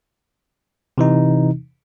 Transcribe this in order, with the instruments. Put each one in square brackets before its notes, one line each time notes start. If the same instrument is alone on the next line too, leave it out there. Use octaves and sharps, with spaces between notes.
[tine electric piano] C3 E3 D#4